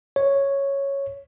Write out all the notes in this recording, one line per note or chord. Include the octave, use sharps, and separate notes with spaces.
C#5